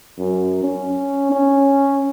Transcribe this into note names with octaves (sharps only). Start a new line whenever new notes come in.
F#2
C#4
C#4